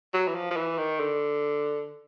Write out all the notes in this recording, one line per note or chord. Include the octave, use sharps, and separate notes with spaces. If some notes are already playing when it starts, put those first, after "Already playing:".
F#3
E3
F3
F3
E3
D#3
D3